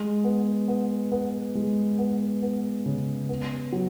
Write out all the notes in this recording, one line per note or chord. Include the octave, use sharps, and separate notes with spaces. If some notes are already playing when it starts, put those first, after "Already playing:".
Already playing: G#3
B3
B3
B3
G#3
B3
B3
C#3
B3
F#3